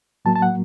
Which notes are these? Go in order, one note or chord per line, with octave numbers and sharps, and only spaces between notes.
A2 F#3 A#3 A5
A5
F#5